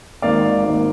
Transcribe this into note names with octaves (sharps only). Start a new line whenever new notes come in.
G#1 G#2 D#3 A#3 D5 F5
G#1 G#2 D#3 A#3